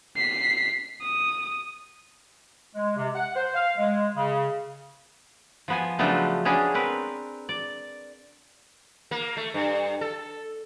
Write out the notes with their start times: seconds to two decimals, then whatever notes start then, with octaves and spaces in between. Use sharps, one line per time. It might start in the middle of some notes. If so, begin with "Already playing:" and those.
0.16 B6 C7
1.02 D#6
2.75 G#3
2.97 C3
3.15 F#5
3.36 C5
3.55 F5
3.77 G#3
4.16 C#3
5.68 F3 B3 G#5
5.99 C#3 F3 F#3 A3 B3 D4
6.45 B3 C#4 D4 G#4
6.74 C4 A#4 B4
7.49 D5
9.11 A#3
9.37 A3
9.54 G2
10.01 A4